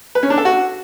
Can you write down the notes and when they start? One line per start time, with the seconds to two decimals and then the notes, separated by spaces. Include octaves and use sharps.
0.15 B4
0.23 C#4
0.30 D4
0.38 A4
0.45 F#4